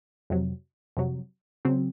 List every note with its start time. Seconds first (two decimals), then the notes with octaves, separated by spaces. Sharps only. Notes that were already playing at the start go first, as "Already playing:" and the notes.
0.30 F2 C3 F#3
0.97 F2 C3 F#3
1.65 C#3 F#3 C4